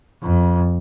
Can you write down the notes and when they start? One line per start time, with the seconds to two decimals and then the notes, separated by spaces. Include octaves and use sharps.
0.23 F2